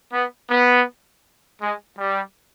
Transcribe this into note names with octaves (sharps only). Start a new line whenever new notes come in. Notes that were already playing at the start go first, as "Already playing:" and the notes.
B3
B3
G#3
G3